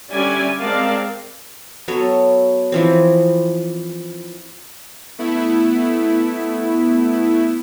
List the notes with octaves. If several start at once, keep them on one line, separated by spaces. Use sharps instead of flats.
D3 G3 C#4 D5 E5 G#5
G#3 C4 A#4 D5 F5 A5
F#3 B3 A4 C#5
E3 F3 C4
A3 B3 E4